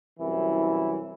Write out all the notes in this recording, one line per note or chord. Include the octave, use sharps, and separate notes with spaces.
C2 F#2 E3 E4